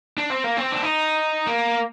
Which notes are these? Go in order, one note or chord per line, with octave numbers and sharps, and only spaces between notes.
D4
C4
A#3
C4
D4
D#4
A#3